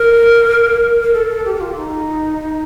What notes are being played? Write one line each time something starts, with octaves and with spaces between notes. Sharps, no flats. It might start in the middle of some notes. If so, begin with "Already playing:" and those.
Already playing: A#4
A#4
A4
A4
G4
G4
F4
D#4